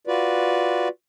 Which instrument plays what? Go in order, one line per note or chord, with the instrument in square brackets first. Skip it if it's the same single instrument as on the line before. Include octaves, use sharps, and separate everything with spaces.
[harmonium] F4 F#4 B4 D5